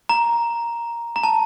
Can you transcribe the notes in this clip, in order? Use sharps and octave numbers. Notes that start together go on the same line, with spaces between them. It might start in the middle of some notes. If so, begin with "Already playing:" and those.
A#5
A#5
A5